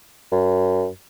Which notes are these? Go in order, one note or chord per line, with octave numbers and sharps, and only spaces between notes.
F#2